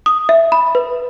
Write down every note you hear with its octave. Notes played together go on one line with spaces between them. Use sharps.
D#6
E5
B5
B4